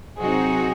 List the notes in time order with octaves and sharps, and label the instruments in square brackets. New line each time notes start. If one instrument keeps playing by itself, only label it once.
[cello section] C3 F#3 C4 D#4 F#4 [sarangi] G#4